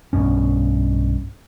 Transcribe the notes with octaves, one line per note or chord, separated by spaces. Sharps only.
B1 G2 B2 C#4